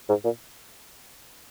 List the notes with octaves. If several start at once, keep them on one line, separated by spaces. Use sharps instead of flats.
G#2
A#2